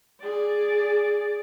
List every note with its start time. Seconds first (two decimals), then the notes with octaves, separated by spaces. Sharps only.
0.22 G#4 D5